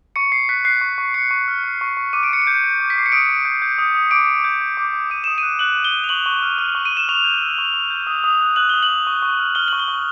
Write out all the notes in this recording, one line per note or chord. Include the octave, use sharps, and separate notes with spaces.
C#6 C#7
C#6 C7
F#6 B6
F#6 C7
C#6
C#6
C#6 C#7
C#6
F6
F6
C#6
C#6
D6 D#7
D7
D6 C#7
D7
G6
G6
D6
B6
D6 C7
C#7
D#6 D7
D#6
G6
G6
D#6
D#6
D6 D7
D6
G6
G6
D6
D6
D#6 D#7
D#6 E7
D#7
F#6
F#6 F#7
D#6
G7
D#6
F7
C#6 F#7
C#6
F6
F6
C#6
D#7
C#6 E7
C#6 F7
G6
E6
C#6
C#6
G6
D#6
D#6
F#6
F#6 F#7
D#6 G7
F#7
D#6
C#6
C#6
F6
F6 G7
C#6 F#7
G7
C#6